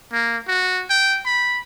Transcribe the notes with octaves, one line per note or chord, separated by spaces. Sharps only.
A#3
F#4
G5
B5